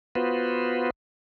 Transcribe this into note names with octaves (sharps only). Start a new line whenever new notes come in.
B3 F4 F#4 B4 C5